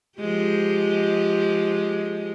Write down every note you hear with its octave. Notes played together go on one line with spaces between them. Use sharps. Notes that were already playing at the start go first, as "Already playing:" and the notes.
F3 G#3 G4